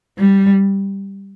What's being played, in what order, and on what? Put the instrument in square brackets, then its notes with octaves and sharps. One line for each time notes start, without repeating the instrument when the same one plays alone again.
[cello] G3